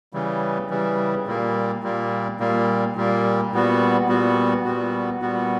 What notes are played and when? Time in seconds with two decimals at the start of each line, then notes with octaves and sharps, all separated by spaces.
0.13 C#3 E3 G3
0.70 C#3 E3 G3
1.26 A#2 G3 A#3
1.83 A#2 G3 A#3
2.40 A#2 G3 A#3
2.96 A#2 G3 A#3
3.52 A#2 G3 B3 F#4
4.08 A#2 G3 B3 F#4
4.65 A#2 G3 B3 F#4
5.22 A#2 G3 B3 F#4